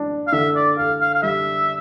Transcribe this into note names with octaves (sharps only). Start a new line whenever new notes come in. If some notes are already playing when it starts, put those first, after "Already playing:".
Already playing: D4
F5
D3 E5
D5
A4 F5
F5
F5
G3 E5